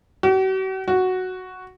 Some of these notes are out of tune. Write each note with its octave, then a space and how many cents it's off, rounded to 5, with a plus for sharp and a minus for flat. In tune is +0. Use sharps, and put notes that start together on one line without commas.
F#4 +45
F#4 +0